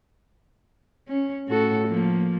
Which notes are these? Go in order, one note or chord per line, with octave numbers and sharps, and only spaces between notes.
C#4
A2 F#4 A4
F3 A#3